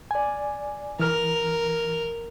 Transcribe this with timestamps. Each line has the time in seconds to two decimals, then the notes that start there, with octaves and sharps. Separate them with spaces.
0.11 D5 G#5
0.99 E3 A#4 F6